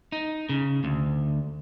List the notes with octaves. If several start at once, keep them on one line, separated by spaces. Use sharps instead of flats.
D#4
C#3
D2